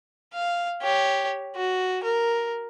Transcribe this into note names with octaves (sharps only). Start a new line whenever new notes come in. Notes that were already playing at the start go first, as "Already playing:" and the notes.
F5
G4 C#5
F#4
A#4